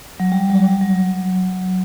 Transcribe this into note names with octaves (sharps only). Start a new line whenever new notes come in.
F#3
G3
F#3
G3
F#3